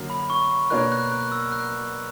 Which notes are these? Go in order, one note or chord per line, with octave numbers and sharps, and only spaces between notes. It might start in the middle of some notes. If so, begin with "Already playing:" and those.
Already playing: F#2 D3 F#3 A#3
B5
C#6
B2 A#3 D4 A#4 C#5 F#6
F#6
F#6
E6
F#6